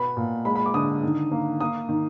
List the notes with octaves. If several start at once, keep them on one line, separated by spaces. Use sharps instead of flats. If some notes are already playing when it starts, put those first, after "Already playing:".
Already playing: B2 B3 B5
A#2
G#3 B5
B5
D6
D3 D#6
D#3
A#3
A#3 D#6
D#3